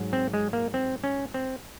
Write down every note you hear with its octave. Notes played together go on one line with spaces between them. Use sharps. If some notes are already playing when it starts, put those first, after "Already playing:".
Already playing: G#2 F#3
C4
G#3
A#3
C4
C#4
C4